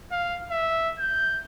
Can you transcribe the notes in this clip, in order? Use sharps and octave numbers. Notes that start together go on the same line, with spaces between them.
F5
E5
G6